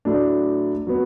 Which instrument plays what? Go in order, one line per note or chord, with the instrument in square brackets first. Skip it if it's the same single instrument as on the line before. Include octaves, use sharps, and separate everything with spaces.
[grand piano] A2 F#3 A3 D4
F#3 B3